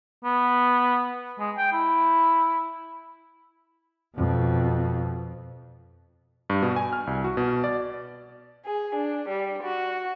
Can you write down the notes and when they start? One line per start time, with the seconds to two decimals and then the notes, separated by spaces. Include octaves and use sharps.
0.25 B3
1.39 G#3
1.58 G5
1.73 E4
4.14 F2 B2
6.50 G2
6.62 B2
6.76 G#5
6.93 F6
7.07 C2
7.24 F#4
7.37 B2
7.64 D5
8.65 G#4
8.94 D4
9.28 G3
9.62 F#4